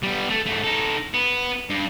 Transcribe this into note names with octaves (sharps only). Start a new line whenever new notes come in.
G3 B3
A3
G#2 A3
D#4 A4
B3
G2